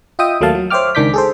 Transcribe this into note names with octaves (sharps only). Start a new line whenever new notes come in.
F4 D#5 E5 G5 D#6
D#2 F#3 A3 A#3 F5 A5
F#3
C5 C#5 E5 G5 D6 F6
C#2 D#3 D4 D6 G6 B6
G#4 A4 C5